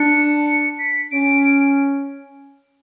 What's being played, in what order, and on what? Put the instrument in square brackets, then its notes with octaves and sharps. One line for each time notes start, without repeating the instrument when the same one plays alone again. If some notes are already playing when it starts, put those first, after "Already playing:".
Already playing: [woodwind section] D4 [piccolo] C#7
[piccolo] C#7
B6
[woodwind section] C#4 [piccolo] D7